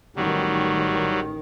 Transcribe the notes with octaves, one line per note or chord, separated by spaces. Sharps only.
A1 D#3 F#3 G3